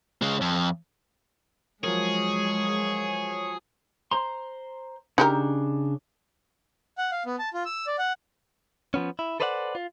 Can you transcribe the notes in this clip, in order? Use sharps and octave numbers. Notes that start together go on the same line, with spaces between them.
C#3 G#3
F2
F3 F#3 G#3 G#4 A#4 C#5
C5 A#5 C6
C#3 D4 D#4 G4 A#4
F#5
F5
B3
A5
F4
E6
D5
F#5
F3 B3 C#4
E4
A4 B4 C5 D5 D#5 F#5
F4